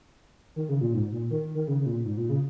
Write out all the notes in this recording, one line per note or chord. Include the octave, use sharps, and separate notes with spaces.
D#3
C#3
A#2
G#2
A#2
D#3
D#3
C#3
C#3
A#2
G#2
A#2
C#3